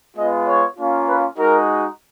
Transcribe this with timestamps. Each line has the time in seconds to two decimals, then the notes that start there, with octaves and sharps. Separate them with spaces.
0.16 G#3 B3 F4 D#5
0.46 C#5
0.77 A#3 C#4 F4
1.07 B4
1.37 G#3 D#4 F#4 A#4